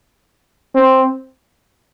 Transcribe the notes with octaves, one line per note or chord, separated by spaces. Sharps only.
C4